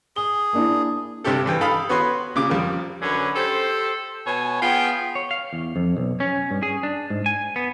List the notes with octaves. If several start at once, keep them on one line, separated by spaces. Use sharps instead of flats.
G#4 G7
A#3 D4 E4
G2 C3 D4 G4 A4
G2 E3 G5
A4 F5 B5 D#6 F6
B3 F#4 B4 C#5 C6
A#2 C#3 D6
F2 G3 A#4
F#2 D3 B4 C#5 G#5
G4 A4 C5
B2 C#5 G#5
B3 F4 G#4 G5
C#5
F5
E2
F2
B1
C#4
G2
G#4
D4
G#2
G#5
B3